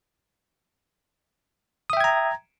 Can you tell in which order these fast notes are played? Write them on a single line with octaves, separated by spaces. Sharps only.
D#6 E5 G5 G#6 A#5